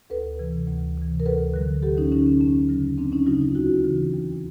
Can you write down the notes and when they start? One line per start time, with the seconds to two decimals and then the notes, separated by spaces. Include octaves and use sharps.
0.10 D2 A4 B4
0.39 C3 E3
0.68 D2
0.97 C3 E3
1.20 A#4
1.26 D2 A4 B4
1.54 D3 F#3
1.82 D2 G4 A4
1.97 C#4 D#4
2.12 D3 C#4 D#4
2.15 F#3
2.26 C#4
2.40 F2 C#4
2.69 C#3 F#3
2.98 F2 C4 D4
3.12 C#4 D#4
3.26 C#3 F#3 D#4 F4
3.41 D#4 F4
3.55 D#2 E4 F#4
3.84 C#3 E3
4.14 D#2